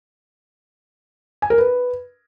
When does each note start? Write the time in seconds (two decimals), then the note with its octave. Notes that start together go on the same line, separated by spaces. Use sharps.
1.42 G#5
1.50 A#4
1.58 B4